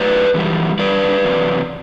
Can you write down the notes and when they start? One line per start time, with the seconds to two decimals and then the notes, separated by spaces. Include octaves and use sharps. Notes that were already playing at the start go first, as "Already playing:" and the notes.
Already playing: A2 F#3 B4 D5
0.34 F#2 E3 G3
0.79 G2 D3 G3 B4 D5
1.24 E2 C3 F#3